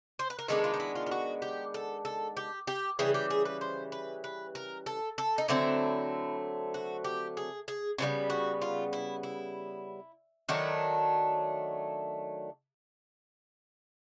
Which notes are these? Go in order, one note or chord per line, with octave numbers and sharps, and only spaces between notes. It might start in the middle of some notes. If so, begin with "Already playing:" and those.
C5
B4
A#4
D#3 G#3 B3 D4 A4
F4
D#4
E4
F4
F4
F#4
G4
A4
A4
G4
G4
C#3 E3 G3 G#4
G4
G#4
B4
C5
B4
B4
A#4
A4
A4
D#4
D3 F#3 A3 C4 E4
F#4
G4
G#4
G#4
C#3 E3 G3 B3
F#4
F4
E4
E4
D#3 F#3 A3 D4 E4